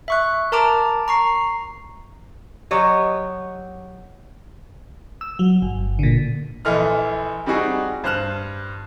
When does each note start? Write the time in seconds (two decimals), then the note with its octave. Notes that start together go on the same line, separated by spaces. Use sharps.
0.08 E5 C#6 F#6
0.52 A#4 A5 A#5 D6 D7
1.08 A#5 C#6 C7
2.71 F#3 G4 C#5 D#5
5.21 E6
5.39 F#3
5.62 G1
5.99 A#2 D3
6.65 A#1 E3 A4 D#5 C6 F6
7.46 G3 C4 D#4 F#4 G#4
8.03 G2 C5 A5 F6 F#6 E7